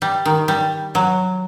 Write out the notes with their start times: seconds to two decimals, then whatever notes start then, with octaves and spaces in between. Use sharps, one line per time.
0.02 G3
0.25 D#3
0.48 G3
0.95 F#3